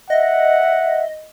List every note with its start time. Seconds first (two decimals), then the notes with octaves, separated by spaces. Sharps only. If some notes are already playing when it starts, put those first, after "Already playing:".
0.10 D#5 E5 F#5